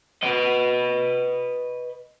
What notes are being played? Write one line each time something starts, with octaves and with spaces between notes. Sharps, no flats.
B4 D#5